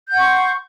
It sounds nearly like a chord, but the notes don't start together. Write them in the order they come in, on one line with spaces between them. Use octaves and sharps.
G6 F#5 C#6 C6